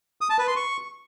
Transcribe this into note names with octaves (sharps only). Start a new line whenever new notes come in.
D#6
A5
B4
C6
C#6